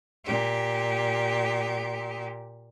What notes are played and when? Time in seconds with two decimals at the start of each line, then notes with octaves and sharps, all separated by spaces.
0.25 A#2 G4